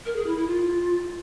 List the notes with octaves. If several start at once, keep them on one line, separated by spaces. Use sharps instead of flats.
A#4
G#4
E4
E4
F4